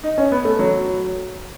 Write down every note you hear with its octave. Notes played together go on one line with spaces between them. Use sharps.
D#4
C#4
B3
A3
F#3